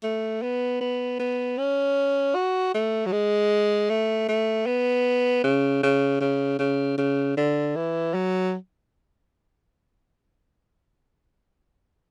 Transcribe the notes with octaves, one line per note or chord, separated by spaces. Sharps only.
A3
B3
B3
B3
C#4
F#4
A3
F#3
G#3
A3
A3
B3
C#3
C#3
C#3
C#3
C#3
D3
E3
F#3